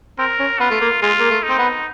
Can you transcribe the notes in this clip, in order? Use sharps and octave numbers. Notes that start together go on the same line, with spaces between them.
C4 A#4
C#4
B3 F4
A3
A#3
G#3 F4
A#3
A3
D#4
C4
B3